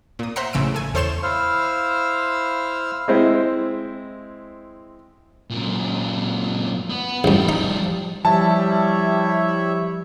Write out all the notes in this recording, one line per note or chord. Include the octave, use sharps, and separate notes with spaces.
A#2 D#6
C5 E5 F#5 A#5 C6
A1 C#3 E6 D7
A4 G#5
E2 A4 C5 C#5 C6 E7
E4 C5 F5 E6 F6
G#3 C4 E4
F#2 A#2
B3
A1 G2 F3 G3
D#4
F3 G3 E4 C#5 E5 A5